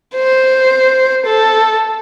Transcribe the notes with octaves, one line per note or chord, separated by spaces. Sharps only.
C5
A4